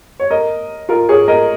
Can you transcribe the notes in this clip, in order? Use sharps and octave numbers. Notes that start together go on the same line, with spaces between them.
C#5
A#4 D#5
F4 A#4
G#4 C#5
A#4 D#5